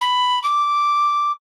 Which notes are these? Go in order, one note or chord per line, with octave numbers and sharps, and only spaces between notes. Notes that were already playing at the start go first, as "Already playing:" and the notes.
B5
D6